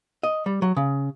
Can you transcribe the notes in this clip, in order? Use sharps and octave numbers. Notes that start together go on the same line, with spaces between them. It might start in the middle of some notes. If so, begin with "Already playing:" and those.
D#5
G3
F#3
C#3